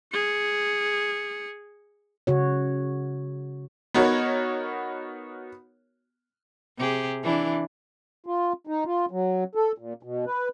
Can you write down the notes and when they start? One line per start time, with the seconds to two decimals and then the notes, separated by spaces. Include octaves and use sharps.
0.12 G#4 C#7
2.27 C#3 F#4 C#5
3.94 B3 D#4 F#4 A#4 C#5
6.78 C3 G4 G#4
7.23 E3 D4 E4
8.26 F4
8.67 D#4
8.85 F4
9.11 F#3
9.55 A4
9.78 A#2
10.03 B2
10.27 B4